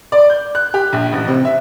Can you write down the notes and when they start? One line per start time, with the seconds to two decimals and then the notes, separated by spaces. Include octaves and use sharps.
0.12 D5
0.30 G6
0.55 F#6
0.74 G4
0.93 A#1
1.12 A1
1.28 C3
1.45 E5